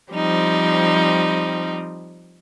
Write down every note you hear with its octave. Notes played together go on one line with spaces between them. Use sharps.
F3 G3 C4 D#4